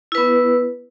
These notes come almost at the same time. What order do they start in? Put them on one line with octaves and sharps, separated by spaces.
E4 B4 B3